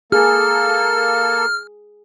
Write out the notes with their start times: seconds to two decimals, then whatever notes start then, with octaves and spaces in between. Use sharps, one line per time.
0.12 A#3 G#4 A4 F6